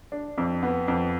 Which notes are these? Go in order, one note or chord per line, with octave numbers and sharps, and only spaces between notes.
D4
F2
B3
F2